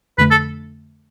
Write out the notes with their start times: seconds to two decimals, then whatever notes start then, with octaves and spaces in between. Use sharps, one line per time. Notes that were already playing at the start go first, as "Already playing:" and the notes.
0.18 F2 D3 A3 B4
0.31 A4